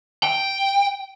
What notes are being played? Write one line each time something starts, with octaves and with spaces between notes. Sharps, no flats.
G5